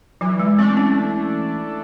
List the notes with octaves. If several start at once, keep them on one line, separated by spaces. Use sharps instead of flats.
E3 F#3
G#3
A3 C4 D4
C#4